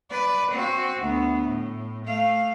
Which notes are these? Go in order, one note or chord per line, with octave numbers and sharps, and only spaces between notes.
B4 D5
C4 F#4
D2 B3
A2
A3 F5